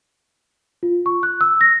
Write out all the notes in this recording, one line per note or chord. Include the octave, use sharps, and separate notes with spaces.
F4
C#6
F#6
E6
A#6